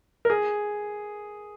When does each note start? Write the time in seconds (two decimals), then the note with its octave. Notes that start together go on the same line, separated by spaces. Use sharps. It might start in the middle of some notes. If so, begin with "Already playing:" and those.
0.25 A#4
0.30 G#4